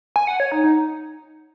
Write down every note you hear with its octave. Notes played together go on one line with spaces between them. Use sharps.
G#5
F#5
C#5
D#4
D#4